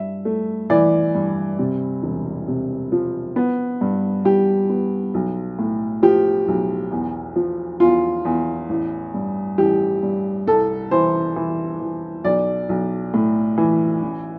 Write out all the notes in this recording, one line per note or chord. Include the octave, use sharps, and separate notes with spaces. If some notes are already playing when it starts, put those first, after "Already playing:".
Already playing: G2 E5
A3
E3 D5
G2
C3
E1
C3
F3
B3
G2
G2 G4
B3
B1
A2
F3 G4
B1
E2
F3
E2 F4
E2
A1
G2
A1 G4
G2
C2 A4
E3 C5
E3
E3
B1 D5
B1
A2
E3
A1